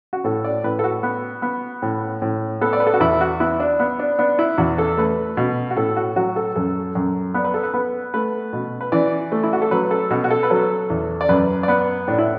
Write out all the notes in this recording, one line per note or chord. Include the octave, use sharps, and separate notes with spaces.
F#4
A2 A4
D5
A2 B4
A4
F#4
B3
B3
A2
A2
B3 A4
D5
B4
A4
F#4
E2 E4
F#4
B3 E4
D4
B3
D4
B3 D4
E4
E2 F#4
A4
A3 B4
B2
F#4
A2 A4
F#4
F#3 F#4
A4
F#2 A4
F#2
B3 D5
B4
A4
B4
B3 B4
A3 B4
B2
B4
E3 D5
A3
E4
F#4
A4
F#3 B4
A4
B2 F#4
F#4
A4
B4
F#3 A4
E2
D5
F#2 B4
D5
B3 B4
A2 D4
E4